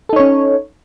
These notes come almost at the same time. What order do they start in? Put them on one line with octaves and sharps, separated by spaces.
A4 D#4 C#5 C#4